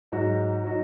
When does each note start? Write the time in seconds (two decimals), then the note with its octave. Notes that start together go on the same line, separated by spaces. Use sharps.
0.12 G#2 F#3 D#4 F#4
0.64 F#3 D#4 F#4